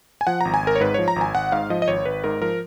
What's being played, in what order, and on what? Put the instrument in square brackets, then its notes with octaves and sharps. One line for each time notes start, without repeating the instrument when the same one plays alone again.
[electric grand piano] G#5
F3 F#5
G#1 A#5
G#5
G#1 A#4
C#5
G#2 B4
F3 C#5
A#5
G#1
G#5
G#1 F#5
G#2 F5
F3 D#5
D#5
G#1 C#5
G#1 B4
G#2 A#4
F3 A#4